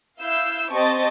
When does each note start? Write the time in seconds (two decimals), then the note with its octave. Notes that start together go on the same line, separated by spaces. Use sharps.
0.20 E4 F5 E6 G6
0.72 C4 G4 D#5 A5 C#6 A6